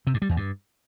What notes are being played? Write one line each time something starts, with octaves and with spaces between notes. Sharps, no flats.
C3
G2
G3
E2
G2